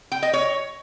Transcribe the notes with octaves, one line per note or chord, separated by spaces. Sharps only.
G5
D#5
C#5